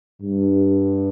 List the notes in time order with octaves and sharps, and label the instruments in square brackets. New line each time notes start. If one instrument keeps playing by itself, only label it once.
[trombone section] G2